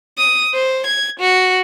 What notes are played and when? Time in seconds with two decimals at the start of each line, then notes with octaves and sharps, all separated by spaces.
0.18 D#6
0.54 C5
0.86 G#6
1.20 F#4